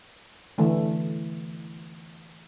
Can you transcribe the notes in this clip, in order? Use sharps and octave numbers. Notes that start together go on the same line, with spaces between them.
D3 E3 A3